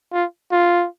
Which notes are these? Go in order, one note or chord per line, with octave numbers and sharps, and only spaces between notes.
F4
F4